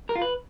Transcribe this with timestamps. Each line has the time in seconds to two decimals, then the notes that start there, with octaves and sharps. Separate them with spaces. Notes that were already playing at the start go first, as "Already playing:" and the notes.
0.09 A#4
0.15 F4
0.22 B4